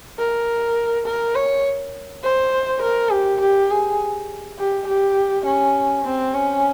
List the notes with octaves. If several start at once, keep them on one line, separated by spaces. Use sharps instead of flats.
A#4
A#4
C#5
C5
A#4
G4
G4
G#4
G4
G4
C#4
C4
C#4